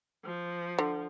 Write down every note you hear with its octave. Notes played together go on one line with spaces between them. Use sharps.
F3
D3